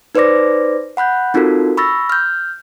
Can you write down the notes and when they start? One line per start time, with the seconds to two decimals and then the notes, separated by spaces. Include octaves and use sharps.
0.15 D#4 B4 C5 D5 D6 A#6
0.97 F#5 B5 F#6 G6
1.34 C4 D#4 F4 F#4 A4 A#4
1.77 B5 C#6 E6 A6 A#6
2.10 F6 G6